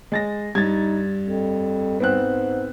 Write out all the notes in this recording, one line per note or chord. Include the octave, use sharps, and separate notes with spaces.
G#3 A6 A#6
G2 D#4 G#6 A6
F2
G#2 B3 C4 F#6